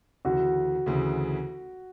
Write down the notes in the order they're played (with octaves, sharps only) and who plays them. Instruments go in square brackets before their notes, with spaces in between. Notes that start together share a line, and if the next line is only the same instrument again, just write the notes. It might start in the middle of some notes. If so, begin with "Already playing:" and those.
[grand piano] D2 C#3 E3 [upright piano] F#4
[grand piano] D2 C#3 E3